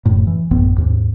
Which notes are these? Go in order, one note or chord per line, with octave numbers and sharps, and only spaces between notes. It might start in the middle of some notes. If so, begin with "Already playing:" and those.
E1 F#2 A2
E3
A1 F#2 B3
D#2 G#2